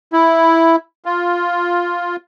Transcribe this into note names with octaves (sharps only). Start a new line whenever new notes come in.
E4
F4